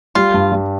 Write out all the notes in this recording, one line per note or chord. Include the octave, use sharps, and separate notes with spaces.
G3 F4
G2
G3